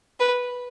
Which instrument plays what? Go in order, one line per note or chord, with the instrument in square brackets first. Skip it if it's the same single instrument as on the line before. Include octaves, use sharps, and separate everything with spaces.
[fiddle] B4